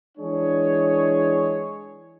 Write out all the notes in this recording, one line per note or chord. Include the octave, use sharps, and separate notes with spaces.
E3 G#3 D4 G#4 C#5